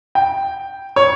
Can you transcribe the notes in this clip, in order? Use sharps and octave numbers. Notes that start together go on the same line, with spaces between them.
G5
C#5